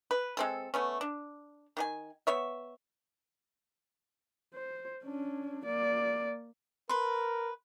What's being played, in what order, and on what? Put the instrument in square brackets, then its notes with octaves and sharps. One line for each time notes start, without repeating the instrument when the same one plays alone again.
[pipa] B4
G#3 C4 A4
A3 B3 C#4
D4
D#3 G4 G#5
B3 C#5 E5
[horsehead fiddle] C5
C#4 D4
A#3 D5
[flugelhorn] A#4 [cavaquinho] B4 C6